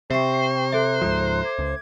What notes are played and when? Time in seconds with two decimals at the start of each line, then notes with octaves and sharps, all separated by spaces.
0.10 C3 G4 C5 E5 A#5 C#6 C7
0.72 A4 E5 A#5 C6 F#6
1.02 C#2 G#2 F3
1.43 D6 G#6
1.59 C#2